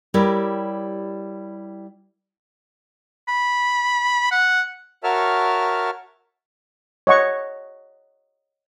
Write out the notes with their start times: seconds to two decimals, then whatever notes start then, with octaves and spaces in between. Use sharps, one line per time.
0.14 G3 E4 G4 A#4 C#5 D5
3.28 B5
4.32 F#5
5.04 F#4 A#4 C#5 E5 A5 F6
7.07 C#5 D#5 F#5 C#6